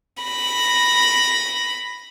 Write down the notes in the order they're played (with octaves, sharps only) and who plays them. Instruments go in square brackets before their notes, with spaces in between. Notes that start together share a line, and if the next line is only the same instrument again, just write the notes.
[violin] B5 A#6